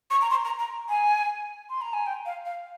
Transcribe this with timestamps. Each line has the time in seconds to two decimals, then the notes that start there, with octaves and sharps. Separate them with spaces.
0.11 C#6
0.21 A#5
0.30 C6
0.45 A#5
0.59 A#5
0.89 G#5
1.70 C6
1.81 A#5
1.93 G#5
2.06 G5
2.26 F5
2.46 F5